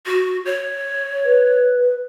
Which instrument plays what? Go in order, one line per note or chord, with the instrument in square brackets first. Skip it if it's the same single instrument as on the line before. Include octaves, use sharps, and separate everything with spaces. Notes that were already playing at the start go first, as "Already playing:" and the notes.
[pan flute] F#4
C#5
[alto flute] B4